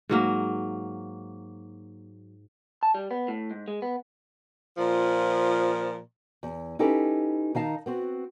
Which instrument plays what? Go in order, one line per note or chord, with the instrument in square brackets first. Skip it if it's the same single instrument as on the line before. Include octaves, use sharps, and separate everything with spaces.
[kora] G#2 F#3 A#3
[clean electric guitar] A5
G3
B3
A2
G#2
G#3
B3
[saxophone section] A#2 F3
[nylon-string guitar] E2
C#4 D#4 E4 G4 A4 B4
D#3 D#4 F5 A5
B3 C4 F#4